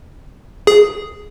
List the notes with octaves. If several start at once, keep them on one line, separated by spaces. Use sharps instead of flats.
G#4